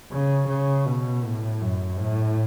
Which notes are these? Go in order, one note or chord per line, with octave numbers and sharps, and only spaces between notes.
C#3
C#3
B2
A2
F#2
A2